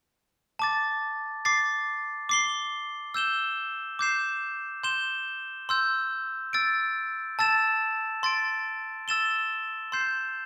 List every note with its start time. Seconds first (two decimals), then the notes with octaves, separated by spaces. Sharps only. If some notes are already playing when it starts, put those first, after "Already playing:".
0.59 A5 D6 A6
1.45 D6 A6 C7
2.29 D6 C7 G7
3.14 E6 G6 E7 G7
3.99 D6 G6 C7 E7
4.84 C6 G6 E7 G7
5.69 C6 E6 G6
6.53 E6 A6 D7
7.39 A5 E6 A6 E7
8.23 C6 A6 D7
9.08 E6 A6 E7 G7
9.92 C6 G6 C7 E7